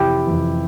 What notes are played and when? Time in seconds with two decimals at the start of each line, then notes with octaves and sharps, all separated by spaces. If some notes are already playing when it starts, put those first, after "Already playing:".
Already playing: F2 C3 E3 E4 G4 G5
0.27 F2 C3 E3